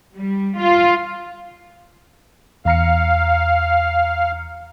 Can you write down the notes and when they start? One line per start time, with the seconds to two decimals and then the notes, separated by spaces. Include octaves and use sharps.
0.16 G3
0.59 F4
2.65 E2 F5 A#5 C#7